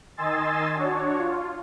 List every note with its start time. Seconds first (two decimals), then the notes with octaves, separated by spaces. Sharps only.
0.17 D#3 D#5 G#5 C6 E6 A6
0.75 D4 F#4 C#5
1.17 F4